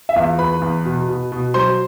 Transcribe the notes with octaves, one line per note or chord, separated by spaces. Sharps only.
E5
E2 F4 F5
E2 B4 B5
E2
B2
B2
B2
F#3 C5 C6